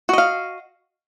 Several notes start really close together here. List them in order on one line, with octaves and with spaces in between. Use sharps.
F#4 D#5 F5